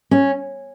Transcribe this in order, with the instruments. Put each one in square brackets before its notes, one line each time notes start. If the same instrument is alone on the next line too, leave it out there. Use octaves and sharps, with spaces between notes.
[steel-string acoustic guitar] C#4